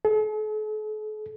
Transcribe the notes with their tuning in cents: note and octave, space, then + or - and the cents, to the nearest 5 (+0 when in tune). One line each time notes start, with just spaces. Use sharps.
A4 -45